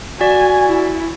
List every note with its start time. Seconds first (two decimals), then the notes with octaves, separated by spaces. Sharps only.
0.21 F#4 D5 G#5
0.67 E4